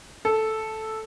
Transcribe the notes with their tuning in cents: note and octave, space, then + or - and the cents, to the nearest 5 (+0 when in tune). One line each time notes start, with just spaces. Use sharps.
A4 -5